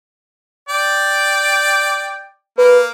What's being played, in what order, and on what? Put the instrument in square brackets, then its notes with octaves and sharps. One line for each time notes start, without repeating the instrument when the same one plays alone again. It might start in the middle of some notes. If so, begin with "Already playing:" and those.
[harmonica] D5 G5
[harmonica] A#3 [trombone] B4